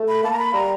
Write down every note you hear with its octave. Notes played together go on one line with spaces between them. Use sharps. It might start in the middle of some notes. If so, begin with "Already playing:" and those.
Already playing: A3
B5
A#3 A5
A#5
B5
G3 A#5